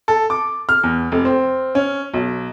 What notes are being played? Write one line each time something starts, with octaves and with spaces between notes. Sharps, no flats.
A4
D6
F6
E2
F1
C4
C#4
B1